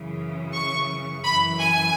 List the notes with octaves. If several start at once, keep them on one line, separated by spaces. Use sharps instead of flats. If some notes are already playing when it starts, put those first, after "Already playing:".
Already playing: F#2 C#3 E3
C#6
F#2 E3 B5
G#5